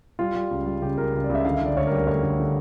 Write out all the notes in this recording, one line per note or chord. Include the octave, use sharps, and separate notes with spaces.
G3 F4
G3
C#2
G3
C#3 G4
C#2 A#4
C#2
D5
C#2
E5
D3 F5
E5
D3
D5
D2 C#5
A#4
G3
A#4
D2 C#5
D2
D3